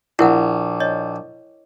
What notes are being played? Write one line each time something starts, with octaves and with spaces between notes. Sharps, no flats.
A#1 E4 A#4 F#5
C#5 D#5